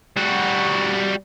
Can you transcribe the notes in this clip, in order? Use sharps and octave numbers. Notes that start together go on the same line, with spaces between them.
G3 F#4